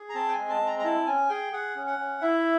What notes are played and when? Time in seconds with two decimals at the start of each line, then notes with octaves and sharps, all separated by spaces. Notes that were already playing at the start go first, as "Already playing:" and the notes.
Already playing: G#4
0.09 A#5
0.15 C4 A5
0.28 G5
0.32 G#5
0.38 G#3
0.49 A5
0.61 C4
0.66 A#5
0.79 A#5
0.84 E4 A5
1.06 C#4 G#5
1.29 G#4 G5
1.53 G#4 F#5
1.76 C#4
1.87 F#5
1.98 C#4
2.21 E4 E5